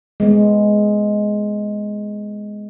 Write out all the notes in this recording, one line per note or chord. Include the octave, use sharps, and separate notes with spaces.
G#3 B3